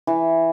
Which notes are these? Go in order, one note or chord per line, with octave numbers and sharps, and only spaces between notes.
E3